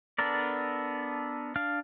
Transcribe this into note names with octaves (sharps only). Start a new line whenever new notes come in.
B3 D4 A4 A#4 D5
D4 F5 F6